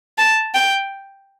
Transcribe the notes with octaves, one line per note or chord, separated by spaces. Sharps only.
A5
G5